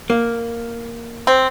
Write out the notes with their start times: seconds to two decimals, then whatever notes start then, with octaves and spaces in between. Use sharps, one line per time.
0.10 A#3
1.27 C4